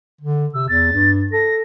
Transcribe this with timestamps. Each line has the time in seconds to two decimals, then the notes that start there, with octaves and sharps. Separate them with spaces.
0.21 D3
0.54 C3 E6
0.69 E2 A6
0.93 G2
1.32 A4 A#6